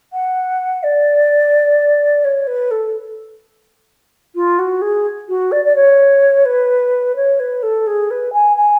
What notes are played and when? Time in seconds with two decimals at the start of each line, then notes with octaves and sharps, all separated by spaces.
0.13 F#5
0.83 D5
2.24 C#5
2.47 B4
2.71 A4
4.35 F4
4.59 F#4
4.81 G#4
5.28 F#4
5.52 D5
5.65 D5
5.75 C#5
6.45 B4
7.16 C#5
7.40 B4
7.63 A4
7.87 G#4
8.10 B4
8.33 G#5
8.57 G#5